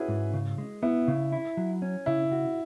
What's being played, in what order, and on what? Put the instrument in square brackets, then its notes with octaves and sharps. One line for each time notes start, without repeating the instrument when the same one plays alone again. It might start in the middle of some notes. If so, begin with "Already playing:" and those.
Already playing: [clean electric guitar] C#4 [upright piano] E4 F#4 G#4 B4
[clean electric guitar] G#2
C#3
G#3
[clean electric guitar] B3 [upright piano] E4
[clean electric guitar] C#3
E4
F#3
C#4
[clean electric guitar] C#3 [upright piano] E4
[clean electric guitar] F#4